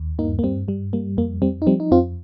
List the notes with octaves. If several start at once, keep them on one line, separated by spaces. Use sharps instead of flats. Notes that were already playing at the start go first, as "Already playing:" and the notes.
Already playing: D#2
G2 A#3 D#4
A#3
G2 G3 C4
G2 G3
G3 A#3
F2 A#3
F2 G3 C4
D#4
F3 G3 C4
D#4
F2 C4 F4